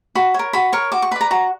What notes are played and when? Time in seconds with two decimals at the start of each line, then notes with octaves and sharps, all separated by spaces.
0.15 F#4 B5
0.34 A#4 C#5
0.53 F#4 B5
0.72 A#4 C#5 C#6
0.92 F#4 D6
1.02 C#6
1.11 B4 B5
1.16 D5 A#5
1.31 F#4 A#5